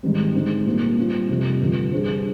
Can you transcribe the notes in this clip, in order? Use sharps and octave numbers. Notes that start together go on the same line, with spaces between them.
G#2 D#3 G3 C4
D3 G#3 C4 D#4
A#2 G3 A#3 F4 C5
G3 C4 F4
F2 C3 G3
G2 D3 F3
G3 D4 G#4 C5